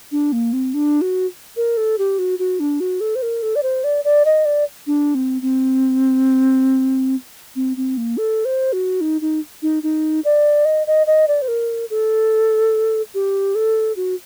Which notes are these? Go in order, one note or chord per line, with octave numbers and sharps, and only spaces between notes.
D4
A#3
C4
D4
F#4
A#4
A4
G4
F#4
F#4
D4
F#4
A4
C5
A#4
A4
D5
C5
D5
D5
D#5
D5
D4
C4
C4
C4
C4
A#3
A4
C5
F#4
D#4
D#4
D#4
D#4
D5
D#5
D#5
D#5
D5
C5
A#4
A4
G4
A4
F#4